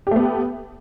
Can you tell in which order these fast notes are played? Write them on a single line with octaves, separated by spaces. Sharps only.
G4 A3 B3